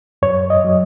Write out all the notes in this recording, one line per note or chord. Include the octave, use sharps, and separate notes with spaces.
F#2 C#5
D#5
F#3